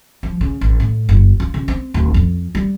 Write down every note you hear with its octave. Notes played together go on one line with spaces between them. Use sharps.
F3
C#3
A1
A2
F#1
F4
C#3
C4
D1
F2
G3